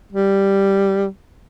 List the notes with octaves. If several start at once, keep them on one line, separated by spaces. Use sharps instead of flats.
G3